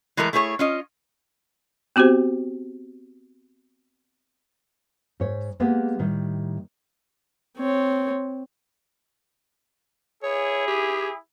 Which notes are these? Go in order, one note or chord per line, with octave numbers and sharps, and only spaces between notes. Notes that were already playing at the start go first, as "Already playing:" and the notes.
E3 G#3 A3 A4 A#4
A3 E4 G#4 C5 C#5
C#4 F4 D#5
B3 C4 F#4 G4 C5
G#2 C#5
G#3 A#3 B3 G4 G#4
A2 D#3 G3
C4 C#5
E4 G#4 C#5
G4